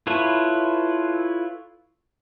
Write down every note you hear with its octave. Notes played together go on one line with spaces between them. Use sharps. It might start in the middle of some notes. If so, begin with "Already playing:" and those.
E4 F4 A4 B4 C#5